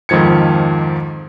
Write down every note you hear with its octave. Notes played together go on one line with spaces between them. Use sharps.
F2 G#2 D#3 F3 G#6 C#7